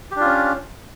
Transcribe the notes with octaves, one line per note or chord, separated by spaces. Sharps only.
C#4 D4 F4 G4